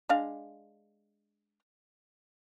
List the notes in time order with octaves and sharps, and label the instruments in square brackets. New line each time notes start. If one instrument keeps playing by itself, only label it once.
[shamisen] G#3 D4 F5